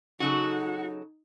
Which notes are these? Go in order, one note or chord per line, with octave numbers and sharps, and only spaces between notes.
C#3 F#3 D#4 F#4 A4